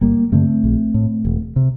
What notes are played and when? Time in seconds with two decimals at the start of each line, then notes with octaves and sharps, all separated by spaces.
0.01 G1 G3 A#3
0.32 G2 D3 A3 C4
0.64 A#1
0.94 A2
1.25 E1
1.56 C3